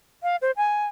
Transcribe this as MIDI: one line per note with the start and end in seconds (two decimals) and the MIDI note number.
0.23 0.36 77
0.42 0.51 72
0.57 0.87 80